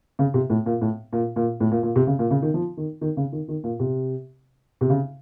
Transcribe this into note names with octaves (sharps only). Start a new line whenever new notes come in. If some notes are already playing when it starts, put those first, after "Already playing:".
C#3
C3
A2
A#2
A2
A#2
A#2
A2
A#2
A#2
C3
C#3
A#2
C#3
D#3
F3
D#3
D#3
C#3
D#3
D#3
A#2
C3
C3
C#3